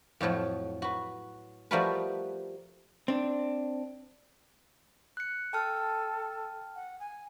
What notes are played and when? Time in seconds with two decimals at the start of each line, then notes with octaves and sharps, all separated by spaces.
0.21 F2 A2 F3 F#3
0.82 F#4 B4
1.71 F3 G3 A3 F#4 A#4 B4
3.08 C4 D4
5.17 F#6 C#7
5.53 A4 G5 A5 F6
6.76 F#5
7.00 G#5